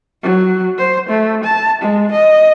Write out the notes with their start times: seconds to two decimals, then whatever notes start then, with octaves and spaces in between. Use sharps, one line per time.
0.23 F#3
0.78 C5
1.09 A3
1.44 A5
1.82 G#3
2.12 D#5